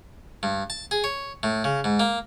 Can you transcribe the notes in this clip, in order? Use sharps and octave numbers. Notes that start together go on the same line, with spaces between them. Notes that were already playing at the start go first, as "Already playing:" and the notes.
G2
A5
G#4
C#5
A2
C#3
G#2
A#3